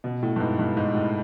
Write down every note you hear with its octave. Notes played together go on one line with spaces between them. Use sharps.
B2
A2
G2
G#2
G2
G#2
A2